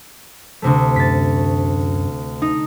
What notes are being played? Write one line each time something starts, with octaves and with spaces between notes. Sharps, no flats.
D2 C3 A3
F#2 A6 B6
D#4